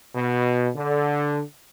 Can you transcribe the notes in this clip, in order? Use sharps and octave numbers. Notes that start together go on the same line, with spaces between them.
B2
D3